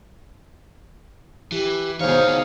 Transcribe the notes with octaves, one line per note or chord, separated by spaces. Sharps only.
E3 G4
D2 B2 D#3 D#4 G#4 C5 C#5 F5